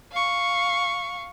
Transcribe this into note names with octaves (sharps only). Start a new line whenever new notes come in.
F5 C#6